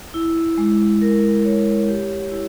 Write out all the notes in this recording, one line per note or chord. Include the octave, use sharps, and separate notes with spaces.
E4
G#3
A#4
C#5
G4
E4